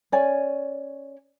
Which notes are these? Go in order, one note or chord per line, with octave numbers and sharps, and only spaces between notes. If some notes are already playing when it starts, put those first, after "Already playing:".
C#4 C#5 D5 G#5